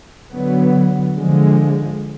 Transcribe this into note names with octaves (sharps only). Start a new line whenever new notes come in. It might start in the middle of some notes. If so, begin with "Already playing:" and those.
D3 F#3 B3
D3 F3 G#3